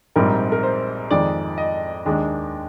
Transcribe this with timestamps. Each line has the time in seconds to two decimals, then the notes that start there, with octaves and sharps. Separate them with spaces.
0.16 A#1 G#2 G3 C4 A#4
0.52 A#4
0.63 C5
1.11 F2 D#3 G#3 D5
1.58 D#5
2.05 D#2 D#3 G#3 D4